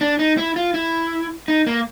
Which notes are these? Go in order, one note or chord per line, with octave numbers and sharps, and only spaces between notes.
D4
D#4
E4
F4
E4
D#4
A#3